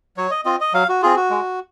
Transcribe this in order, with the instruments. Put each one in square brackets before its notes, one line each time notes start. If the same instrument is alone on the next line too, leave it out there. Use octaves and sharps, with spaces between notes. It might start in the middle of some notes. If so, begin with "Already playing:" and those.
[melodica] F#3 C#5
D#5
C4 F4 D#5
D#5
F#3 F5
F#4
C4 F4 G#4
F#4
G#3